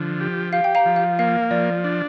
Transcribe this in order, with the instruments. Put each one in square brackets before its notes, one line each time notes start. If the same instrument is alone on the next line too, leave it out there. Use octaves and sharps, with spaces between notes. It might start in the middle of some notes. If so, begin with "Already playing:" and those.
Already playing: [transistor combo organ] D3 F3
G4
[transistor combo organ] G4 [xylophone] F5
[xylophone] G5
F5 A#5
[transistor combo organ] F3
[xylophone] F5
[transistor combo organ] A#3 [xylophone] F5
[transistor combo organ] F3 [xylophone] D5
[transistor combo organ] D4